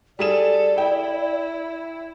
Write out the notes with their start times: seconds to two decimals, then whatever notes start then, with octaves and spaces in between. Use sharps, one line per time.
0.19 G3 G#4 A4 D5 E7
0.78 E4 G5